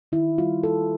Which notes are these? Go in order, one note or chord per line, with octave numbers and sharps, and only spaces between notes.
D#3 E4
G3 F4
A#3 A4